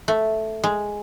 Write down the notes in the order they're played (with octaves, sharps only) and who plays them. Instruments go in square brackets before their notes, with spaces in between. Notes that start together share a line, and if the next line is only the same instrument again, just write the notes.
[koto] A3
G#3